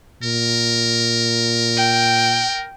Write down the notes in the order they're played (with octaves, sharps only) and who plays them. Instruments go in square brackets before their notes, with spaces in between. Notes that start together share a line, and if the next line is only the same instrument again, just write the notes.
[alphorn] A#2 [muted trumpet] A#4
[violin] G5